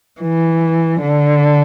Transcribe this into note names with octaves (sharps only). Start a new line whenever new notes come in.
E3
D3